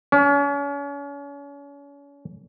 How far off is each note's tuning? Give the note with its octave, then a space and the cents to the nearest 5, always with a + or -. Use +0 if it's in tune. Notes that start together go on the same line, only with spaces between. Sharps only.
C#4 +40